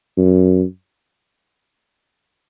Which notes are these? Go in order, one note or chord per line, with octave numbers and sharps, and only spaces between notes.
F#2